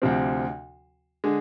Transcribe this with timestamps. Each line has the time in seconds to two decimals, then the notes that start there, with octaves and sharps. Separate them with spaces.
0.02 D2 C3 F3 C4
1.24 D3 G#3